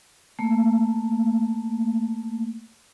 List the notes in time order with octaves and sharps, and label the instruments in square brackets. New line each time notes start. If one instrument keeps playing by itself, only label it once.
[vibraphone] A3 A#3